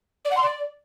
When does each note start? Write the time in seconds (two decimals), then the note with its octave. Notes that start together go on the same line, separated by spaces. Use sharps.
0.24 D5
0.30 F#5
0.36 C6
0.42 D5